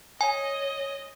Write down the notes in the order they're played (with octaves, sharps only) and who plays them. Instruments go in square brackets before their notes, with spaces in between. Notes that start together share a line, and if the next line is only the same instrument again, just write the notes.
[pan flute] C#5 [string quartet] D#5 [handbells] G#5